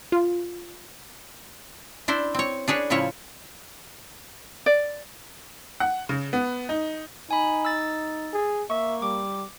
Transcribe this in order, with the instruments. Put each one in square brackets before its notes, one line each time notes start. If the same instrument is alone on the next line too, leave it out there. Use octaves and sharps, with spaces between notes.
[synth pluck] F4
[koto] D4 E4 C5
C4 C#5
D4 G#4 B4 C#5
A2 C#3 F3 E4 C#5
[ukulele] D5
[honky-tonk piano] F#5
C#3
B3
D#4
[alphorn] D#4 [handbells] G#5 B5
[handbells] E6 A6
[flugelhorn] G#4
[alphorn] A#3 [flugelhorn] E5 [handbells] C#6
[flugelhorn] G3 [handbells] D6